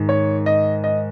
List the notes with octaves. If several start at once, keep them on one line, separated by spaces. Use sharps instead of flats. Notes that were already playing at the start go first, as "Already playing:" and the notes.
Already playing: G#2 D#3
C#5
D#5
D#5